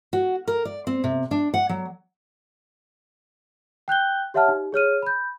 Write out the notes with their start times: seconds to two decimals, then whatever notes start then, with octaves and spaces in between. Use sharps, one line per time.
0.13 F#4
0.47 A#4
0.65 D5
0.87 C4
1.04 C3
1.31 D4
1.54 F#5
1.69 F#3
3.88 G5 F#6 G6 G7
4.34 G4 C#5 E5 F#5 A5 F6
4.48 D#4 G4
4.72 G#4 C#5 F6 D#7
5.02 B5 G6